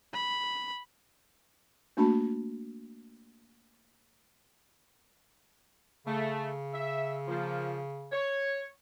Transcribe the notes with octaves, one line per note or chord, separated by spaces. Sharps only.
B5
A3 A#3 D4 F#4 A5 B5
C#3 A3
E5
F3 A#3
C#5